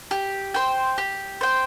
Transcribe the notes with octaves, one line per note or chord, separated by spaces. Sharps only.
G4
C5 G5
G4
C5 G5